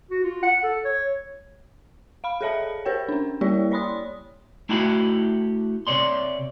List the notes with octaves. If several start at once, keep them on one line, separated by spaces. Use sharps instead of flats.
F#4
F4
F#5
A4
C#5
F5 B5
G#4 A4 C#5 E5 A5 B5
G4 A#4 C5 C#5 G5
C#4 D4
G3 A#3 E4 G4 C#5 D5
C#5 D5 B5 C6 D#6
A3 E4 F#4 G4 F#5 B5
C3 C#5 D5 C6